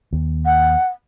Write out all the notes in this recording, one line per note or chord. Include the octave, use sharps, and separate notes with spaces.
D#2
F#5